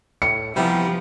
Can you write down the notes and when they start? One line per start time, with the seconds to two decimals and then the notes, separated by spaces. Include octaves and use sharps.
0.22 A2 C#7
0.56 C3 E3 F3 G3 B3